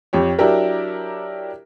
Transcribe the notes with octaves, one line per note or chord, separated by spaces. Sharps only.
F2 G4 C#5
F#3 D4 E4 G4 A#4